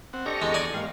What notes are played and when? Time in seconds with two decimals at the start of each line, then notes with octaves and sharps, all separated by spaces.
0.13 C4 F#5
0.26 D4 G4 A4 D#5 A#5 C#6
0.42 E2 G#3
0.54 D5 G#5
0.74 G#2 A#3 G4 F5